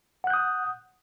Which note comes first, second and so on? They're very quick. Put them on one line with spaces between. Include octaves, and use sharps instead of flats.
F#5 F#6 G6 D#6